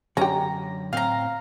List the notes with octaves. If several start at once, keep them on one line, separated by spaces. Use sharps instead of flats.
F#2 D3 C#4 G4 A#5
A2 C4 F5 A#5